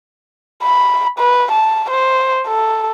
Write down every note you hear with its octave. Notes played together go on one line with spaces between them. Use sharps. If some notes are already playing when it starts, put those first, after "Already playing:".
B5
B4
A5
C5
A4